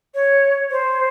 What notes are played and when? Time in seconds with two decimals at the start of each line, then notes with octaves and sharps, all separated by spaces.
0.15 C#5
0.71 C5